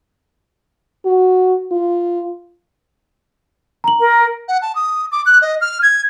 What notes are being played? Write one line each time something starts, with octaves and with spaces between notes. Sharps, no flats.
F#4
F4
A#5 F#7
A#4
F#5
A5
D#6
D6
F#6
D#5
F6
G#6